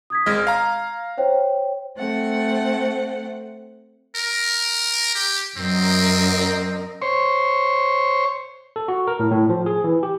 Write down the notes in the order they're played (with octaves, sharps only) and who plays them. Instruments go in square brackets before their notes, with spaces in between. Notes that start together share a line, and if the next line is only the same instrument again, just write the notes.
[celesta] D#6 G#6 B6
[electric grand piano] G#1 G#3 D#5 [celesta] F6 G#6
[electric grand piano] F5 A#5
[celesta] C5 C#5 G5
[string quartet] A3 C4 F#5
[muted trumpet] A#4
G4
[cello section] F#2 A#4 D#5 [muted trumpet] C4
[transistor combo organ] C5 C#5
[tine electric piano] A4
F#4
A#4
A2
A2
F3
G#4
E3
G4